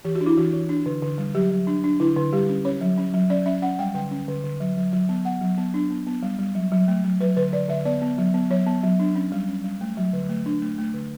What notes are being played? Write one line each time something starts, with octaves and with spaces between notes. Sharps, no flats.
E3 G4
F#4
D4
E4
E3 F#4
E3
D4
D3
D3
G3
F#3 G4
F#3
D4
D4
D3 E4
D3
G3 G4
C#4
C#4 C#5
F#3
C#4
F#3
C#4 D5
C#4 E5
C#4 F#5
G3 G5
D3 G5
C#4
D3
D3
F#3
F#3
F#3
B3
B3 F#5
F#3
B3
D4
B3
B3
G3
G3
F#3
F#3
A3
F#3
F#3 B4
D3 B4
D3 D5
D3 E5
B3 D5
B3
F#3
B3
F#3 C#5
B3
F#3
D4
C#4
G3
C#4
G3
A3
F#3
D3
A3
D4
A3
A3
D3